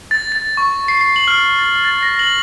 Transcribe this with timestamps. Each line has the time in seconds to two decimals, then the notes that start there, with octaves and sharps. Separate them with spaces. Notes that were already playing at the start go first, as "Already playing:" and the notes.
0.11 A6
0.32 A6
0.57 C#6
0.88 C7
1.01 C7
1.16 F#7
1.28 F6
1.59 A6
1.85 A6
2.03 A#6
2.19 F#7